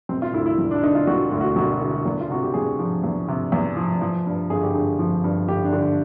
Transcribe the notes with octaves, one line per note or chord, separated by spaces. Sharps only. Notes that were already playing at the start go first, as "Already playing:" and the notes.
E1 C4
F4
D2 E4
E4
E1
D4
D3 D#4
F4
E1 F#4
D2
F#4
E1 F#4
D3
E2
F4
C3 F#4
G4
E2 G#4
F3
E2
C3
E2
F3
F3
G2
G1 G#4
G4
D3 G#4
F3
G2
G1 G4
D4
D3